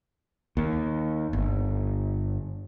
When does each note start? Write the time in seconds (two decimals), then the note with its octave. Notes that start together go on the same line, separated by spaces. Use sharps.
0.57 D#2
1.33 G1